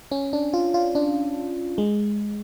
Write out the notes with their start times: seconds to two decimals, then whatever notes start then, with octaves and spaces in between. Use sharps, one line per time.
0.12 C#4
0.33 D4
0.53 F4
0.74 F4
0.95 D4
1.78 G#3